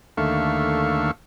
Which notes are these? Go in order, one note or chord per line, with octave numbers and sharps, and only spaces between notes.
D#2 D3 A3 E5 F5 C#6